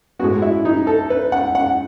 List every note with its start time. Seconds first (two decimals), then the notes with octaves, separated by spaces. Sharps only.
0.19 A2 G#3 B3 F#4
0.42 E4
0.65 D#4
0.87 A4
1.10 B4
1.32 F#5
1.55 F#5